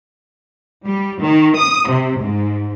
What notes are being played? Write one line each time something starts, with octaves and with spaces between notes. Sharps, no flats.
G3
D#3
D#6
C3
G#2